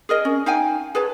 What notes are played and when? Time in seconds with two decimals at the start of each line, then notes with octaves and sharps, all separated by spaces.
0.09 G#4 A#4 D#5
0.25 C#4
0.46 D#4 F5 G5 G#5
0.95 G#4 B4 C#5 A5